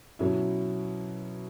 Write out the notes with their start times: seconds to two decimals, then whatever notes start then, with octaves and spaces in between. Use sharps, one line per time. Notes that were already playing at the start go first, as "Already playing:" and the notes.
0.19 B2 F#3 C#4 E4